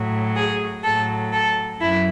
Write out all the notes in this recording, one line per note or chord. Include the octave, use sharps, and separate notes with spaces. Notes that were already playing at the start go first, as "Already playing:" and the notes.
Already playing: A2 F#3
G#4
A2 F#3 A4
A4
F#2 E4